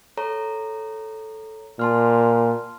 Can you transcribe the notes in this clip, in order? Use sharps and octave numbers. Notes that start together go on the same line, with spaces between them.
A4 C#5 A#5
A#2 A5 C6 F6